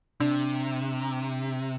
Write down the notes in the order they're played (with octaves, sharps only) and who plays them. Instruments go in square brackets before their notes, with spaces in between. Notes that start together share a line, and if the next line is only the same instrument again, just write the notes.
[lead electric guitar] C3 [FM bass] D4